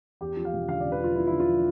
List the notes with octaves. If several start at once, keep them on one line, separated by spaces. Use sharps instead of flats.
E2 G4
F3
F5
E1
D3 F5
D5
D3
B4
F3 F4
E2 E4
E4
D3
F4
F3